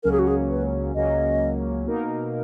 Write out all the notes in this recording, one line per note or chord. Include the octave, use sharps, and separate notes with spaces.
C#2 C#3 F#3 A#3 C#4 A#4
G#4
F#4
G#4
B4
C#2 C#3 F#3 A#3 C#4 D#5
B2 A#3 D#4 A#4